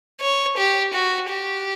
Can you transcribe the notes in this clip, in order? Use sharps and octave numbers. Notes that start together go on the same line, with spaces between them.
C#5
G4
F#4
G4